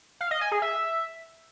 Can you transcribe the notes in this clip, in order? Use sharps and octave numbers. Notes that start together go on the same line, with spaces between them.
F5
D#5
G#5
G#4
E5